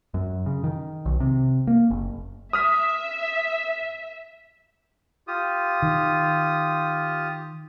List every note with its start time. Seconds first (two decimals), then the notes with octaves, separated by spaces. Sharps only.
0.14 F#2
0.46 C#3
0.64 D#3
1.06 B1
1.20 C3
1.67 A#3
1.90 F#1
2.53 E5 D#6 F6 B6
5.28 F4 G4 D#6
5.82 D#3